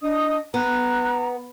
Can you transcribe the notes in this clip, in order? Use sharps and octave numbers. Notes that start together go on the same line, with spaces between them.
D4 D#5 D#6
B3 A#5 F#6